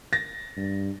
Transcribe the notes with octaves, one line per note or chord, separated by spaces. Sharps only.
A6 A#6
G2